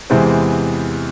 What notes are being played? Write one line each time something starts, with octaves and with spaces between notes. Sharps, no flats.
E2 C3 E3 G#3 C4